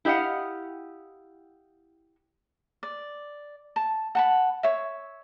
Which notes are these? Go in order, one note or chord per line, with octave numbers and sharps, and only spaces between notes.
E4 G4 D#5 F5 F#5
D5
A5
F#5 A5 B5
C#5 E5